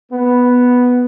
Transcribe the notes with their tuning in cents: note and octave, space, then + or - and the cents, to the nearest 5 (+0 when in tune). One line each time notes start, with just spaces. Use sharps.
B3 +0